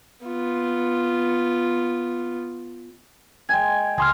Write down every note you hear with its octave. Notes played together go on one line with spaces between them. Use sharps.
B3 F4
G#3 G5 G#5
C#2 G#3 G#4 C6 F6